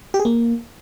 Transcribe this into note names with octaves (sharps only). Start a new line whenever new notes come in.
G4
G#4
A#3